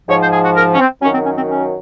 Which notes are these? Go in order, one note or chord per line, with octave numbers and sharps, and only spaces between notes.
G#2 F3 C#5
C5
G#4
F#4
A#4
C#4
C4
F#2 D#3 F#3 C#4
C4
C#4
C4
C#4